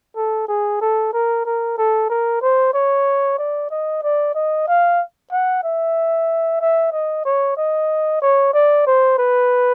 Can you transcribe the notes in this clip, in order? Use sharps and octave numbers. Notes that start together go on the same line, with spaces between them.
A4
G#4
A4
A#4
A#4
A4
A#4
C5
C#5
D5
D#5
D5
D#5
F5
F#5
E5
E5
D#5
C#5
D#5
C#5
D5
C5
B4